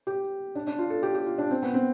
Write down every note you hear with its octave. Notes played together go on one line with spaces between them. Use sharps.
G4
D4
D4
F4
A4
G4
G4
F4
D4
C4
B3
C4